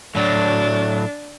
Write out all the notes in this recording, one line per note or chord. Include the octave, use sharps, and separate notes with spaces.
A2 F#3 D4